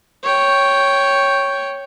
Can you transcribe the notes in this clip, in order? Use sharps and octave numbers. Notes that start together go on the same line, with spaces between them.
C#5 G5